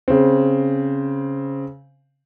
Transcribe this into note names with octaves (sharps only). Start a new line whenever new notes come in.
C#3 C4